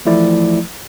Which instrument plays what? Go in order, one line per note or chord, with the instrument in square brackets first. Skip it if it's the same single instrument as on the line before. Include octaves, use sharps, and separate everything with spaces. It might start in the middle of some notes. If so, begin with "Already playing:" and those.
[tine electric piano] E3 F3 A3 E4 D5